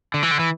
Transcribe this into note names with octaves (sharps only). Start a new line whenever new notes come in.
D3
E3
D3
E3